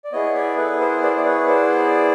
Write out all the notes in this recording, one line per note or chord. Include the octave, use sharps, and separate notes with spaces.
D5
B3 E4 G#4 C#5 D#5
D5 E5
A4 B4
A#4 C5
C5 D5
D5
B4 C#5
C5 D5